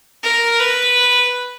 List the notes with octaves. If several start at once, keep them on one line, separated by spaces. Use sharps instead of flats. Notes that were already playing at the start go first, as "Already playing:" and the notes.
A#4
B4